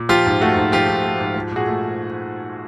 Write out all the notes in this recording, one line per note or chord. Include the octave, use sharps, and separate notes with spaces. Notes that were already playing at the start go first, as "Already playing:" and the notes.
Already playing: A#2
F3 F4 G4
G#2
A3 F#4
G#2
F3 F4 G4
G#2
A3
G#2
F3
A#2 F#4 G#4
A3